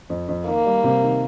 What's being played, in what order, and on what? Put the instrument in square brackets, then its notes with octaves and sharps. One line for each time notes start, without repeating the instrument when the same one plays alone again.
[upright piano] F2
F2
[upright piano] D#3 [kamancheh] A#3
[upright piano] G3
C3
D#3